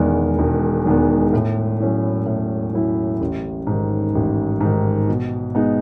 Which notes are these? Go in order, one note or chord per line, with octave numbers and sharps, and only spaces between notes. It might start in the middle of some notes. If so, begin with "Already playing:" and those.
Already playing: E1 E2 D#3 G#3 B3
E1
E2 D#3 G#3 B3
A2
F#3 C#4 E4
A2
F#3 C#4 E4
A1
G#2 D#3
A1
G#2 D#3
B2
G#3 B3 D#4